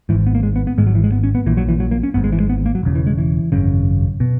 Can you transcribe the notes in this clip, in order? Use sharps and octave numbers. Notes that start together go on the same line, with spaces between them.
G#1 G#2 E3
B3
A#3
G#3
B3
B3
G#1 G#2 G#3
F#3
E3
G#3
B3
C#4
B3
A#1 A#2 E3
F#3
E3
F#3
A#3
C#4
G#1 G#2 B3
G#3
E3
G#3
B3
A#3
F#3
E1 E2 C#3
E3
G#3
E3
G#1 F#2 C#3
B2